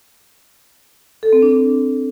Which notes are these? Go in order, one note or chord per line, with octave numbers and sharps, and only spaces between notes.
A4
C4
D4